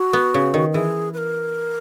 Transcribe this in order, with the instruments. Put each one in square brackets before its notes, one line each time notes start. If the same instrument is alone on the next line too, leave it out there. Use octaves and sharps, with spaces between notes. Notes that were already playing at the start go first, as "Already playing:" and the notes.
Already playing: [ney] F#4
[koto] B3
C#3
D#3
[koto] E3 [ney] G#4
[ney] B4
A#4